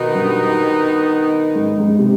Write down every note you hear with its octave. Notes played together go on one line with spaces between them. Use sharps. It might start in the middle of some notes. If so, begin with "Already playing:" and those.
Already playing: B2 D#3 B3 D#4
G2
G#2
G#2
C3